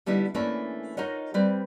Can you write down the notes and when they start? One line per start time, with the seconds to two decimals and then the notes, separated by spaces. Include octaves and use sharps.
0.06 D3 G3 B3 D#4 E4
0.34 E3 A3 A#3 C#4 D4 E4
0.97 D#4 F4 A#4 C#5 D#5 F#5
1.34 G3 C4 B4